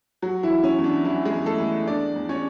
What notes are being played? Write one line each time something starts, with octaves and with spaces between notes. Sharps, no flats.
F#3 F#4
E3 E4
F#3
C#4
E2
D4
E3 F#3 E4
G#3 G#4
E2
A3 A4
E2
E2 D4 D5
E2
C#4 C#5